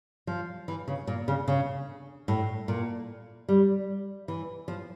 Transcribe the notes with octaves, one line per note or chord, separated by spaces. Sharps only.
F3
E3
C#3
A#2
C#3
C#3
A2
A#2
G3
E3
F3